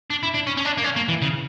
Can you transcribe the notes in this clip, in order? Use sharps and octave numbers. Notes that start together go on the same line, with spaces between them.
D4
E4
D4
C#4
C#4
D4
A#3
C#4
A#3
E3
C#3